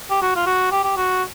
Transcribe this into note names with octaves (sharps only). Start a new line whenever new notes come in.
G4
F#4
F4
F#4
G4
G4
F#4